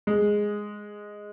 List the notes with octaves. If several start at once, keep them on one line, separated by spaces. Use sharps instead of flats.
G#3